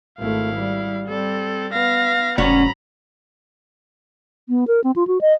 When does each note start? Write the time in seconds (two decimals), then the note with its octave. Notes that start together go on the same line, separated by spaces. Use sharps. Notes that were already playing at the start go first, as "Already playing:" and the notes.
0.19 G#1 A3 E4 F5
0.56 G3
1.07 G3 C4 A4
1.73 B3 F5 A#6
2.38 F1 G#2 F#3 C#4 D4 F#4 A#5 B5
4.49 B3
4.68 A#4
4.84 C4
4.96 F4
5.07 F#4
5.21 D#5